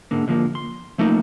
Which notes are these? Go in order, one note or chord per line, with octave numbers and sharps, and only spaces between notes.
G#2 D3 A#3
D2 D3 F3 G#3 A#3
C6
F3 A3 A#3 D#4